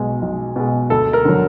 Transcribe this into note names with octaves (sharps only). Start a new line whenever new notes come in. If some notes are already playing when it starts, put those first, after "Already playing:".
Already playing: B1 B2 G#3
B1
B2 G#3
D2 A4
A#4
D3 F#3